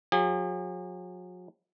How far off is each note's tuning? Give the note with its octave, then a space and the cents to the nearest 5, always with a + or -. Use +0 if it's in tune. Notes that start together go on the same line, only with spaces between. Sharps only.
F#3 -40 G#4 -40